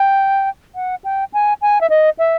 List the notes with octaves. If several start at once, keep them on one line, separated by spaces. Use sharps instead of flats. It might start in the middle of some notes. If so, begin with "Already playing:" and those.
Already playing: G5
F#5
G5
G#5
G#5
E5
D#5
E5